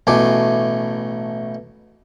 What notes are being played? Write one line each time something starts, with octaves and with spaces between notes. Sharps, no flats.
A1 B2 A3 G#5 D6